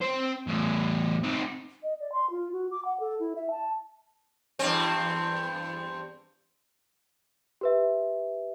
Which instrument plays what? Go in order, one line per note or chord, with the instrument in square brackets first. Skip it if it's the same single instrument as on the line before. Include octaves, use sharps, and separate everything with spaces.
[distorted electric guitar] C4 C5
E2 A2
C4 D#4
[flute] D#5
D5
C6
F4
F#4
D6
F#5
A4
E4
E5
A5
[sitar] E2 G2 C4
[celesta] G4 B4 E5